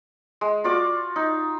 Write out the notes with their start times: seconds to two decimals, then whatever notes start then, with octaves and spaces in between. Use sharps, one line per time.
0.41 G#3
0.64 F4 F#4 D5 D6
1.16 D#4